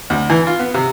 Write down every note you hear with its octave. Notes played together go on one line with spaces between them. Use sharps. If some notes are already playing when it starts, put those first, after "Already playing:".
D2
E3
F4
B3
C3